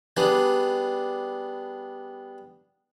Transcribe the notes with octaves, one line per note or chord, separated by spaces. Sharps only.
G3 B3 D4 G#4